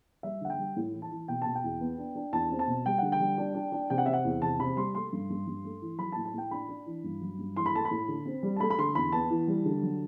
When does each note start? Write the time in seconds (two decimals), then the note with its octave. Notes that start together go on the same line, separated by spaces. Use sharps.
0.23 G3 E5
0.41 D3 F#5
0.50 G5
0.59 G3
0.76 A2
0.93 E3
1.02 A5
1.11 E3
1.28 B2 G5
1.42 B2 A5
1.55 G5
1.64 E2
1.81 B3
1.98 D4
2.16 D4
2.33 E2 A5
2.51 C4
2.59 A5
2.68 B2
2.86 G3 G5
2.98 D3 F#5
3.12 G5
3.20 G3
3.38 D4
3.55 D4
3.72 D4
3.90 C3 G5
3.98 F#5
4.06 C4 E5
4.13 F#5
4.25 E2
4.42 C3 A5
4.60 C3 B5
4.77 G3 C6
4.95 A3 C6
5.13 G2
5.30 G2
5.47 G2
5.64 A3
5.82 E3
5.99 F#3 B5
6.12 A5
6.16 A2
6.25 A5
6.34 A2 G5
6.51 D4 B5
6.69 D4
6.86 E3
7.04 G2
7.21 F#3
7.39 G2
7.56 E3 C6
7.66 B5
7.74 A3 A5
7.85 B5
7.91 A2
8.08 D3
8.26 C4
8.43 G3
8.56 A5
8.60 A3 B5
8.70 B5
8.78 D3 C6
8.95 E2 B5
9.12 B3 A5
9.30 E3
9.48 G3
9.66 D3
9.83 F#3